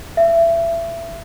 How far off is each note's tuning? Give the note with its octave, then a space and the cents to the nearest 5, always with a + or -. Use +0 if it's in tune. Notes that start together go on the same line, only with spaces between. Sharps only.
E5 +25